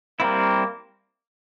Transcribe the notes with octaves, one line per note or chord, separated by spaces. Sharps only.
G3 A#3 C4 E4